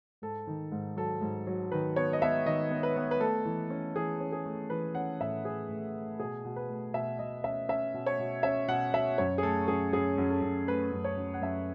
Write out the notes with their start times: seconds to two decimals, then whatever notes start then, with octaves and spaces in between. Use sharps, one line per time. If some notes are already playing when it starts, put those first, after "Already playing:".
0.22 G#2 A4
0.47 D#3
0.72 G#2
0.96 F#3 A4
1.21 G#2
1.47 F#3
1.72 D#3 B4
1.96 B3 C#5
2.13 D#5
2.22 B3 E5
2.46 D#3 D#5
2.71 B3
2.83 B4
2.96 B3
3.11 B4
3.20 A3 A4
3.45 E3
3.70 C#4
3.95 E3 G#4
4.20 C#4
4.32 G#4
4.46 A3
4.70 E3 B4
4.95 C#4 F#5
5.20 A2 E5
5.45 C#4 G#4
5.69 A2
5.95 A3
6.19 B2 G#4
6.45 B2
6.56 B4
6.70 A3
6.94 B2 E5
7.19 B2 D#5
7.44 C#4 E5
7.69 C#4 E5
7.94 B2
8.06 C#5
8.19 B2
8.43 C#4 E5
8.68 B2 F#5
8.94 B2 E5
9.18 F#2 C#5
9.38 G#4
9.43 A3 A4
9.68 F#2 G#4
9.93 F#2 G#4
10.18 F#2
10.30 A4
10.42 F#2
10.68 A3 B4
10.92 F#2
11.04 C#5
11.17 F#2
11.34 F#5
11.42 F#2 E5